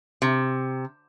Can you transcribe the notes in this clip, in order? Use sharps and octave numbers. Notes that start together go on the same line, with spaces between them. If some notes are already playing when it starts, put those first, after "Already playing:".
C3